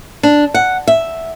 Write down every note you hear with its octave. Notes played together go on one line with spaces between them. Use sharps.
D4
F#5
E5